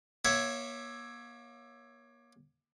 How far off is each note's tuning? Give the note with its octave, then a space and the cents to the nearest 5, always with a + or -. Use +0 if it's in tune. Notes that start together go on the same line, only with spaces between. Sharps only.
A#3 +35 C#5 +0 E5 +0